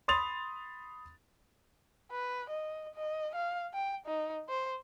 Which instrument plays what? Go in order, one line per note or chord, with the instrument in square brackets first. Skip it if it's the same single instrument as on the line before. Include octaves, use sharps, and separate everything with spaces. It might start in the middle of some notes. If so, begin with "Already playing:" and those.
[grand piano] B5 C6 D#6 A6 F7
[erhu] B4
D#5
D#5
F5
G5
D#4
C5